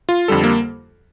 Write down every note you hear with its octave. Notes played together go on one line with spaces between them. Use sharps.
F4
F2 D3 G3 A4
A#3